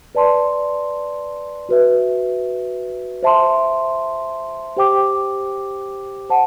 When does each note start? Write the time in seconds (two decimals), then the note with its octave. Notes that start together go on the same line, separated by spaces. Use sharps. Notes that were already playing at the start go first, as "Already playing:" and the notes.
0.15 B4 D5 A5 C6
1.69 F#4 B4 E5
3.23 C5 E5 A5 C6
4.77 G4 C5 G5 D6
6.30 C5 F#5 A5